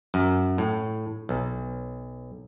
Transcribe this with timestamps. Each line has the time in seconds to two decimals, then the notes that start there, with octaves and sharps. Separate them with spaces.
0.14 F#2
0.58 A2
1.29 B1